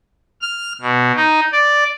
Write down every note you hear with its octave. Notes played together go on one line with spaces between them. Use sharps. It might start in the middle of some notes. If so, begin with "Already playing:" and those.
F6
B2
D#4
D5